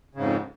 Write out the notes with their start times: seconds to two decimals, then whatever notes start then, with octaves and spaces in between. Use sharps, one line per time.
0.14 C#3
0.17 G#2
0.20 F2